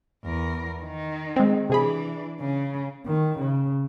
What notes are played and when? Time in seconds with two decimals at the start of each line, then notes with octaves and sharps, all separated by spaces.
0.24 E2 A#4
0.82 D#3 D#4
1.36 G#3 C4
1.70 C3 E3 D4 G#4 B5
2.40 C#3
3.07 D#3
3.40 C#3